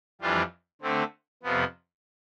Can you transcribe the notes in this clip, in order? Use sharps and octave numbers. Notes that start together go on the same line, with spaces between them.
F2 E3 G3 D4 F4
D3 A3 C4
F2 C3 F3 B3